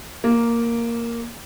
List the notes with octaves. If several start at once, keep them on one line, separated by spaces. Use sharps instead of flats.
A#3